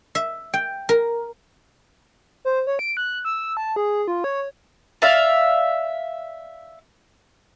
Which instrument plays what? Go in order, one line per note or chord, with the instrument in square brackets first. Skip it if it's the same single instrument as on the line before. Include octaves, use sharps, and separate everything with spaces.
[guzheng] E5
G5
A#4
[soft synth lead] C5
C#5
D7
F#6
E6
A5
G#4
F4
C#5
[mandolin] D5 E5 F5